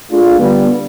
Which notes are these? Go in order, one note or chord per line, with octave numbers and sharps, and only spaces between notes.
A3 D4 F4 G#4
D3 G3 B3